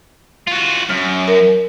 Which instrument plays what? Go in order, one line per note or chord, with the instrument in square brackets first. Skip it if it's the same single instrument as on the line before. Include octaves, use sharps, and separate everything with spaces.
[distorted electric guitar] F4 F#4
[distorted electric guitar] F#2 [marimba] F6
[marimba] A#4